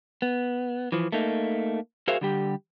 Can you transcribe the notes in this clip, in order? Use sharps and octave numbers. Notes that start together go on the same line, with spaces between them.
B3
E3 F3
A3 A#3 D#4
F#4 G#4 A#4 C5 E5 F5
D3 G3 G4